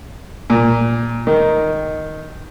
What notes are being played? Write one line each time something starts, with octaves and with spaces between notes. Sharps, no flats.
A#2
D#3